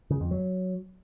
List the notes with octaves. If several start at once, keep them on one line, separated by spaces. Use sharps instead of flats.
C#3
F2
F#3